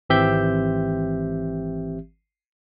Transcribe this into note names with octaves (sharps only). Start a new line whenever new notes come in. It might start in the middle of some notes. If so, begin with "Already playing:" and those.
G#1 E3 C4 G4 E5 G6